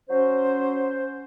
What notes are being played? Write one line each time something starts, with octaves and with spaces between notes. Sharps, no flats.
F#3 C#4 C5